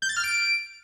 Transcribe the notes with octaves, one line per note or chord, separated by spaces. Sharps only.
G6
A6
F6
D7